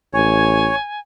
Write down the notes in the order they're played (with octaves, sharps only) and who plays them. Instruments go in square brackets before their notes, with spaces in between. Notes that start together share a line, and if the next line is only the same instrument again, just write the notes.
[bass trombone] A1 [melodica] C#5 [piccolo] G#5